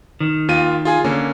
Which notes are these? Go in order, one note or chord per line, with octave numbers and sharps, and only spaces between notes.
D#3
D#2 F4 D#7
F4 G#4 G#5
D3 A#3 C#4